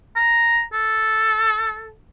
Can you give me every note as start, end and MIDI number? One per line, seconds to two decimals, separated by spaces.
0.16 0.63 82
0.73 1.93 69